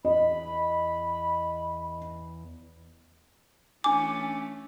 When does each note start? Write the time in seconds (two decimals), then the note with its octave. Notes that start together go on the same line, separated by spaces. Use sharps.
0.05 E2 D#5 B5
3.84 E3 A3 C#4 D4 G#5 D6